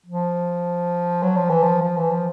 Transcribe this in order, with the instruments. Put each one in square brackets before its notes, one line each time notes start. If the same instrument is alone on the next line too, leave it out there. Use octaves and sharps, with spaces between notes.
[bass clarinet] F3
F#3
F3
E3
F3
F3
E3
F3